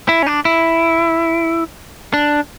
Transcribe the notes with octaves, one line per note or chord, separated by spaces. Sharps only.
E4
C#4
D4
E4
D4